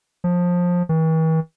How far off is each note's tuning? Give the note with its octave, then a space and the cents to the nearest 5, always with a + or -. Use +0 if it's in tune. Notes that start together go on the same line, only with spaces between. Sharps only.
F3 +20
E3 -45